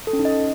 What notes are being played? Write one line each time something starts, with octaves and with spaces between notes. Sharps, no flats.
A4
C#4
D#4
D#5